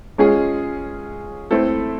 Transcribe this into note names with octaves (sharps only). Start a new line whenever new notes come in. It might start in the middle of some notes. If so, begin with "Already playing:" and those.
G#3 C#4 F4 G#4
A3 C4 E4 A4